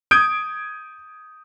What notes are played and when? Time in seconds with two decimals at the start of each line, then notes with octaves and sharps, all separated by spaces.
0.11 D#6 G6 G#6 D7